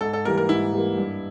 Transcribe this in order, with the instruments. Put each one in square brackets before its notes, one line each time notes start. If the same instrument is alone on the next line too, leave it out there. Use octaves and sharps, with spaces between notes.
[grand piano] G#2 [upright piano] A4
[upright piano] A4
[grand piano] E3 G3 A#3 [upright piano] A#4
[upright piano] A#4
[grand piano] G#2 [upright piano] E4
[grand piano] E3 G3 A#3
G2